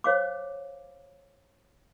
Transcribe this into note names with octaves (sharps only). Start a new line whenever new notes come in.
C5 C#5 F5 D6